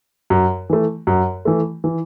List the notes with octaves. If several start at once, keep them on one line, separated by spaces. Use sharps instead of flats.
F#2
E3 A3
F#2
E3 A3
E3